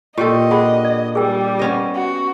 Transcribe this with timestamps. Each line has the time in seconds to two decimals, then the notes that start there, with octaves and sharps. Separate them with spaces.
0.18 A#2 G4 A4 D#5 C#6
0.51 D4 G#4 F#5 B5
0.85 D5
1.15 G3 G#4 A#4 G5
1.59 B3 C#4 D#5
1.95 F#4